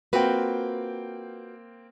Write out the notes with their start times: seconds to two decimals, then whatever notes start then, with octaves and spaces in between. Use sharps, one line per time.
0.13 A#3 C4 F4 F#4 B4 G5